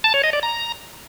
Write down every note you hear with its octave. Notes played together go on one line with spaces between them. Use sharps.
A5
C#5
D#5
D5
A#5